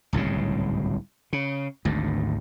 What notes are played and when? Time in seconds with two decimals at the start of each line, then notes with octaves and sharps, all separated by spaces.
0.13 D1 C2 G#2 C#3
1.33 C#3
1.85 G#1 D2 G#2